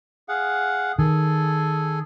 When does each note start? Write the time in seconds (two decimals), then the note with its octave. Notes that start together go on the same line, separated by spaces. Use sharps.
0.28 G#4 F5 F#5
0.99 D#3 G#4 A4 G#5